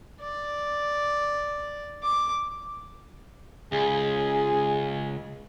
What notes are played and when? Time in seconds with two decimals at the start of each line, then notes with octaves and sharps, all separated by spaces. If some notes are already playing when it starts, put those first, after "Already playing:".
0.21 D5
2.04 D6
3.72 C#2 G#4